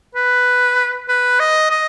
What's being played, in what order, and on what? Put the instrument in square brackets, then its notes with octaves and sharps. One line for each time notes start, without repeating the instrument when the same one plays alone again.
[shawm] B4
B4
D#5
D#5